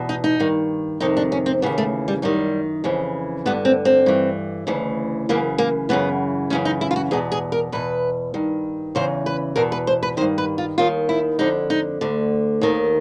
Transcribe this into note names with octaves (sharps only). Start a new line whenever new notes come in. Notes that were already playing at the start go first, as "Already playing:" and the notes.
Already playing: E2 B2
D#4
D#4
G2 D#3
F2 C3 D#3 D#4
D4
C#4
C4
D#2 C#3 E3 B3
A3
G3
F#2 D#3 G3
F2 C#3 E3
G2 D3 B3
C4
C4
G2 E3
D2 C#3 E3
F#2 C#3 E3 A#3
A#3
F#2 C#3 E3 B3
F#2 C#3 E3 C#4
D#4
E4
F4
F#4
E2 B2 G#4
G#4
A#4
E2 B2 B4
G2 D#3
E2 C#3 E3 C5
B4
E2 B2 A#4
B4
C5
B4
G2 D#3 C5
B4
F4
D#2 D#3 F4
E4
F2 D3 D#4
D#4
D2 D3
D#2 D#3